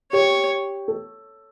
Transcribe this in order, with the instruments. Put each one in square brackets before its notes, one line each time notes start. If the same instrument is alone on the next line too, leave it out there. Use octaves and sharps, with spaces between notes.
[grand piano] G4 [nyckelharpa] C#5
[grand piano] A4